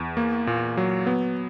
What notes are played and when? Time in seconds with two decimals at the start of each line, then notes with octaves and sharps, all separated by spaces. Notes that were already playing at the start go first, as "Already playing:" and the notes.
Already playing: E2
0.17 A#3
0.47 A#2
0.77 F#3
1.07 B3